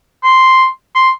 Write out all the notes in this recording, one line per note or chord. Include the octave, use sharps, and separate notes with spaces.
C6
C6